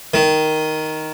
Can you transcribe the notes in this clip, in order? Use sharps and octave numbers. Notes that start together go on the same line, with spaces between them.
D#3